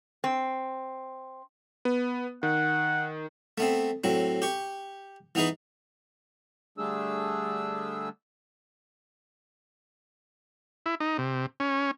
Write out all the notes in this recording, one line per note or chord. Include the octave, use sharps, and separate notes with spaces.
C4
B3
D#3 F#5
A3 B3 C4
A2 F#3 C4
G4 C#6
E3 B3 D#4 G#4 B4
D3 G3 A3 D4 G#4 E6
E4
D#4
C3
C#4